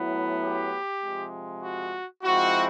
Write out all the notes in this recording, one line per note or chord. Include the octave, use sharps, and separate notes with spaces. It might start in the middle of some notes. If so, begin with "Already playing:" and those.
Already playing: A2 F#3 B3 E4
G4
C3 F3 G#3
F#4
F3 G#3 C4 E4 F#4